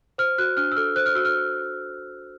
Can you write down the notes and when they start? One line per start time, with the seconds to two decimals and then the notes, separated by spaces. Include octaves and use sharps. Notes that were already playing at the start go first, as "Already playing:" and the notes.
0.18 C5 F6
0.38 F#4 F#6
0.57 D4 F6
0.72 E6
0.76 A4 F6
0.96 C5 F#6
1.06 F6
1.15 F#4 E6
1.25 F6